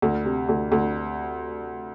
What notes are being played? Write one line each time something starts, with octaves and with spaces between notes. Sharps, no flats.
D2
C3
D2
D2